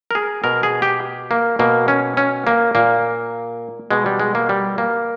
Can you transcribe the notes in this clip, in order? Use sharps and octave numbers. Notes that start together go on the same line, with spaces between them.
A#4
G#4
B2 A#4
G#4
G4
A#3
B2 A#3
C#4
C#4
A#3
A#2 A#3
B2 G#3
G3
G#3
A#3
G3
A#3